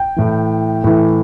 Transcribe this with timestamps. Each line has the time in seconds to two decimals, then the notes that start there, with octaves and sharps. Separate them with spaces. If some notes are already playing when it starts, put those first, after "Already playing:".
Already playing: G5
0.16 A2 E3
0.84 A2 E3